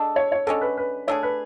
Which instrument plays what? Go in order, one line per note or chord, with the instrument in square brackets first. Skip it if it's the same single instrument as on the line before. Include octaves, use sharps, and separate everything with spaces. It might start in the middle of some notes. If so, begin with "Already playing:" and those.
Already playing: [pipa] G#3 D4 A4
[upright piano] C#5
C#5
[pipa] D3 G#3 C#4 [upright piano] A4
[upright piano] B4
B4
[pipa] A3 D4 G#4 [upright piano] C#5
[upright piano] B4